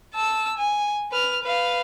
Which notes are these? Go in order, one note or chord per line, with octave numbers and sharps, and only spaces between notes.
A5 E6
G#5
B4 F6
B4 F5